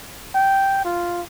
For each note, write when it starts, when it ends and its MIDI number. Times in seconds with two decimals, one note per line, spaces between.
0.35 0.80 79
0.85 1.22 65